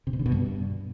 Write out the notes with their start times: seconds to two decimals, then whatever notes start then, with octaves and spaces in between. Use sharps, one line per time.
0.07 C3
0.13 B2
0.19 D3
0.26 B2
0.32 G2